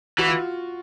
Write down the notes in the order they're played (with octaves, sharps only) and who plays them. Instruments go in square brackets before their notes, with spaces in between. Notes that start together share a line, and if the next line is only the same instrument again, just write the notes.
[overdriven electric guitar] E3 [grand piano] F#4
[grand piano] F4